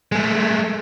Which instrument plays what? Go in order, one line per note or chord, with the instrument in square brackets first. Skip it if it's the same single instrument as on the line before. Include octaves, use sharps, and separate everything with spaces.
[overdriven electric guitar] G#3 A3